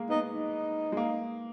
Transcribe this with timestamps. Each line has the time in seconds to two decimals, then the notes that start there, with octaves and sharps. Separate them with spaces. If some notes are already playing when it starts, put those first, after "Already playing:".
Already playing: G#3 A#3
0.10 B3 D#4
0.29 D#4
0.92 G#3
0.97 A#3